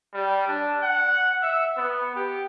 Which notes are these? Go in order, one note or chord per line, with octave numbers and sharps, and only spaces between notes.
G3
D4
F#5
E5
B3
G4